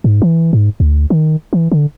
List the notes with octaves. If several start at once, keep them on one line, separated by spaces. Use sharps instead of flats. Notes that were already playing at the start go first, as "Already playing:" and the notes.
G#2
E3
G#2
D2
D#3
E3
D3